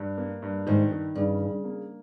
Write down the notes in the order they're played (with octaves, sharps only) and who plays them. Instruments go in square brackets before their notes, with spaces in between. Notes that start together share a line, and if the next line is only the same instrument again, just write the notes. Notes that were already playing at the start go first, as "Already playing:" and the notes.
Already playing: [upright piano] G2
A#3
G2
[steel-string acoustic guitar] G#2 [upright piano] D#3
[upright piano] D#3
[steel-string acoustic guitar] G2 [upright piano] C#3
[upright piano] C#3
A#3